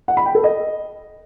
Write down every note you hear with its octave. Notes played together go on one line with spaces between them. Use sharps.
F#5
B5
G5
A4
D#5